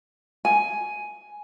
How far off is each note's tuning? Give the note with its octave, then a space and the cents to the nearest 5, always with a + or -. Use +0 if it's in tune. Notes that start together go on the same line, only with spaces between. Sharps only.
G#5 +5